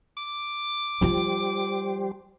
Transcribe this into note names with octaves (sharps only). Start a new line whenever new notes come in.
D6
F3 G3 F4 G4 C5